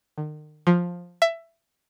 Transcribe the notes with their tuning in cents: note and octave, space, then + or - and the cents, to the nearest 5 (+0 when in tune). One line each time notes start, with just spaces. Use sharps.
D#3 -40
F3 +10
E5 +15